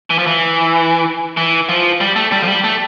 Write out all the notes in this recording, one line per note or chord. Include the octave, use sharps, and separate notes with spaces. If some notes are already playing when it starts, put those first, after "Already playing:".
E3
F3
E3
E3
F3
G3
A3
G3
F3
G3
A3